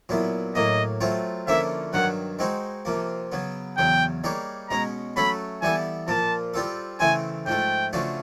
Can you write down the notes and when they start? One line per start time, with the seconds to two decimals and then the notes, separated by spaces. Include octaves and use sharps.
0.09 A#2 F#3 B3 E4
0.55 A2 F#3 A#3 D#5
1.01 F#3 A3 C4 F4
1.47 D3 F3 A#3 C#4 E4 E5
1.93 G2 D#3 F#3 F#5
2.39 G#3 C4 D#4 F#4
2.85 C3 F3 A#3
3.32 C#3 F#3 B3
3.77 E2 C#3 F#3 G5
4.24 G3 A#3 D#4 G#4 C#5
4.69 B2 G#3 C#4 A#5
5.17 F#3 A3 C#4 F#4 A4 B5
5.62 E3 G3 B3 E4 A4 G#5
6.08 A#2 F3 A#3 A5
6.54 G3 C4 F4 A4
7.00 C#3 E3 A3 C4 G#5
7.46 G#2 F3 A3 G5
7.93 C#3 F3 A3 D4 F#4